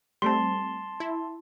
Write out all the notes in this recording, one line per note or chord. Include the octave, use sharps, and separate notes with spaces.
G3 A3 C4 A5 C6
E4